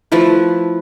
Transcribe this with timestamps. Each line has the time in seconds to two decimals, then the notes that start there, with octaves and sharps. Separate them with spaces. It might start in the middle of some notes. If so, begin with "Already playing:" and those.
0.12 F3 A3 E4 B4